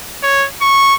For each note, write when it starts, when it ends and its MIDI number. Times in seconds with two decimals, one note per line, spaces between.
0.23 0.46 73
0.62 0.95 85